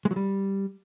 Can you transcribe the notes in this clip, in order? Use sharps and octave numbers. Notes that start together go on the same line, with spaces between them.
G#3
F#3
G3